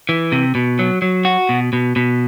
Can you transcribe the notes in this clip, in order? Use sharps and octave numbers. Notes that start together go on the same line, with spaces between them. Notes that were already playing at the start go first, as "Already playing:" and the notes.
E3
C3
B2
F#3
F#3
F#4
B2
B2
B2